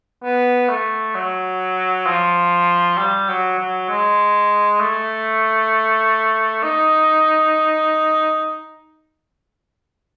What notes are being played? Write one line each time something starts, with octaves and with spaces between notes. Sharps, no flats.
B3
A3
F#3
F3
G3
F#3
F#3
G#3
A3
D#4